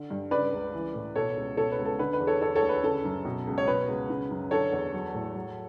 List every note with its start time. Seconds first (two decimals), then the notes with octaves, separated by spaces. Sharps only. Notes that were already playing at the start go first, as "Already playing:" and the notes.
Already playing: D3
0.11 G2
0.31 C#3 B4 D5
0.53 C#2
0.74 E3
0.94 A2
1.16 B2 A4 C#5
1.37 C#2
1.57 B2 A4 C#5
1.72 B4
1.79 C#2
1.85 A4
1.99 D3 B4
2.13 B4
2.20 E2
2.27 A4 C#5
2.41 D3 A4 C#5
2.56 A4 C#5
2.62 D2
2.69 B4
2.83 C#3 A4
3.05 F#2
3.25 B2
3.47 C#2
3.58 C#5
3.67 B2 B4
3.88 C#2
4.10 C#3
4.31 F#2
4.51 D3 A4 C#5
4.72 E2
4.93 F#3
5.14 A2
5.35 F#3